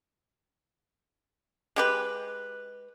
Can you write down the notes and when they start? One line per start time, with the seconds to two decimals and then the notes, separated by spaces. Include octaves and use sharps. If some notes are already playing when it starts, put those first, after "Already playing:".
1.76 G#3 G4 B4